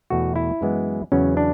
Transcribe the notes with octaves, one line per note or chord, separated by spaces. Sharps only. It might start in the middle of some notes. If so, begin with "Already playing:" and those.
E2 B2 A3 F#4
E4
F#2 E3 G#3 B3
E2 C#3 F#3 B3 C#4
D4